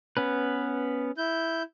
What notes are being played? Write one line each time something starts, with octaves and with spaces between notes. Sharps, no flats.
B3 C#4 B4
E4 G6